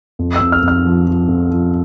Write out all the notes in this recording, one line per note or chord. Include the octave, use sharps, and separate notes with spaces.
F2
F2 E6
F6
F2
F6
F3
F3
F2
F3